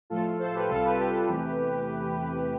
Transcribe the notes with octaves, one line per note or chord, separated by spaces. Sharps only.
A2 F3 A3 F4 A4
A4 C5
G4 B4
C2 C3 G3 F4 A4
G4 B4
G4 B4
E2 C3 E3 A3